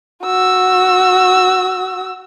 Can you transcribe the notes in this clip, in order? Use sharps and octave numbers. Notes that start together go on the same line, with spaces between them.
F#4 E6